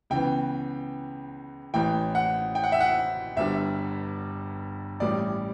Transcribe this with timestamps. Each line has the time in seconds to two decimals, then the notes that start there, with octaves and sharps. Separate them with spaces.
0.10 C#2 C#3 E3 B3 G5
1.74 A1 A2 E3 G5
2.15 F#5
2.55 G5
2.64 F#5
2.72 E5
2.80 F#5
3.36 G1 G2 D3 G3 E5
5.00 A1 A2 G3 D5